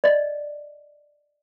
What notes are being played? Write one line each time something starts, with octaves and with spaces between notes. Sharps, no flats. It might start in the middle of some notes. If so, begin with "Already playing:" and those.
D5 D#5